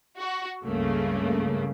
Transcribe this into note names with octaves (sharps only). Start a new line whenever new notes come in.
F#4
C#2 G2 C#3 A3 A#3